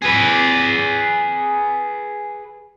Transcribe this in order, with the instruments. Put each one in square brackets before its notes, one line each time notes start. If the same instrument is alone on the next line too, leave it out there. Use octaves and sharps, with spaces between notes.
[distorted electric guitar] G#4 B4